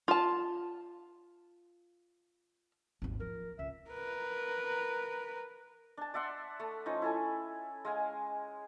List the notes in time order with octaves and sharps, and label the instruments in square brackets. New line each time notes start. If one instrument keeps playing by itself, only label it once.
[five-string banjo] F4 A5
[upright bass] G#1 D#2
[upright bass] F3 [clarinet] A#4
[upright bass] C#2 [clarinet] E5
[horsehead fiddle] A#4 B4
[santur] D4 A5
D5 E5 F#5 C6
A3
F3 C#4 D#4
E4 A4 G#5
G#3 F5 G#5